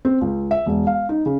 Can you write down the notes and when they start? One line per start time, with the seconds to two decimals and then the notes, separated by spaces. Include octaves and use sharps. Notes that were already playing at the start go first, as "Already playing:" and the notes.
0.05 C4
0.21 C#2
0.51 E5
0.66 E1
0.87 F5
1.09 D#4
1.26 C#3